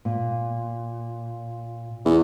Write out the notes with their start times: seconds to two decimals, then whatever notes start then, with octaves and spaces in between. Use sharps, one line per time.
0.05 A#2
2.05 E2